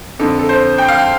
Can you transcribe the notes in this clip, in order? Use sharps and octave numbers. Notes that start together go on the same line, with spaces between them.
F2 D3 A4
A4
C5
G5
F5
G5